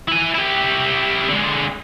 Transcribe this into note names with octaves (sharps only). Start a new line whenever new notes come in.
E4 G#5
E4 G4
D3 G#3